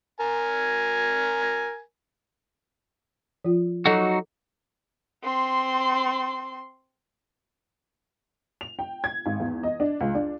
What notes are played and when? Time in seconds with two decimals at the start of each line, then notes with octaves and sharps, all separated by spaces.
0.21 A#4 G#5
3.45 F3 F4
3.86 F#3 D#4 F#4 A4 D6
5.24 C4 C6
8.61 F7
8.79 G5
9.04 G#6
9.26 G#1
9.40 E2
9.63 D#5
9.80 D4
10.01 C#2
10.15 D4